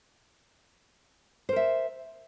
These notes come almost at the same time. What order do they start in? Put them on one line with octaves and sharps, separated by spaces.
C5 A#4 E5